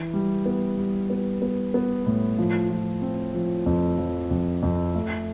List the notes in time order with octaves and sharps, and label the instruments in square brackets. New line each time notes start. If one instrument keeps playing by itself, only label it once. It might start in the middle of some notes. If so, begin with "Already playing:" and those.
Already playing: [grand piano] E3
G3
B3
G3
B3
B3
B3
A2
F3
F3
C4
F3
F2
F3
F2
F2
A3